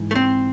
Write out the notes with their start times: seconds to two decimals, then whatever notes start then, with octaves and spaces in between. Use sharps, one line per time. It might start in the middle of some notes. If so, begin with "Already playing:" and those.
Already playing: G#2 E3
0.11 A3
0.15 C4